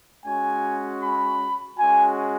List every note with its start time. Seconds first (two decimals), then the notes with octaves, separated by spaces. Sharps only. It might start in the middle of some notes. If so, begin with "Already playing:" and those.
0.24 G#3 C#4 F#4 G#5
1.01 B5
1.78 G#3 C#4 F#4 G#5